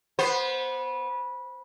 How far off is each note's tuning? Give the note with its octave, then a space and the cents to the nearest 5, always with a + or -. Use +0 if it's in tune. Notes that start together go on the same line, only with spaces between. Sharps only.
B3 -20 C5 +0